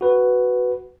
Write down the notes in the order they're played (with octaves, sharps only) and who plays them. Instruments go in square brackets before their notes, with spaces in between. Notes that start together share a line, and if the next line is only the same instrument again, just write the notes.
[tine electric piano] F#4 B4